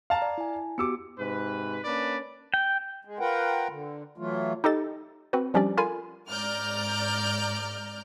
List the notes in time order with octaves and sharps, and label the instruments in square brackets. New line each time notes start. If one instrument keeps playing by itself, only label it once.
[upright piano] F5 A5 A#5
[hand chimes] D5
E4 G#5
[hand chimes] B3 F#4 G4 [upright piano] D6 E6 C#7
[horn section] G#2 C3 B4
A#3 C#4 D4 B4 D5
[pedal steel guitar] G5
[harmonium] G#3
F4 A#4 B4 F#5 G5
D3
E3 F#3 A3 F4
[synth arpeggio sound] D#4 G4 A4 D#5 A6
C4 F#4 B4
F3 G3 C#4 D4 G4 D5
F4 A4 A#4 F5 G#5 B5
[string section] G#2 D5 A#5 F6 G6